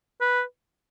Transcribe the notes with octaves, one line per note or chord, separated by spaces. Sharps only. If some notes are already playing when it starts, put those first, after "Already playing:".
B4